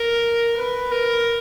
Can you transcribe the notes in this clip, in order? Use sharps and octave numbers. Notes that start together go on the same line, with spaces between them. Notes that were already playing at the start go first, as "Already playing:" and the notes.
Already playing: A#4
B4
A#4